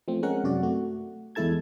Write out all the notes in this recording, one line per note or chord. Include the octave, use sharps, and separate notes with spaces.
F3 A3 C4
G#3 C#4 A#4 F#5
F#2 C3 F#4 D5
A3 F#4
E2 G#3 E4 A4 A5 G#6